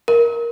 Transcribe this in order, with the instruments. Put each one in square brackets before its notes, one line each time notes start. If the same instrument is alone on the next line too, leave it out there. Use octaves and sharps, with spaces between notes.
[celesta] A#4